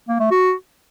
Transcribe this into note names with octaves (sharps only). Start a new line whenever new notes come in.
A#3
A3
F#4